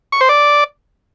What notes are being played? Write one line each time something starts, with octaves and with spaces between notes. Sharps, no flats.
C#6
C5
D5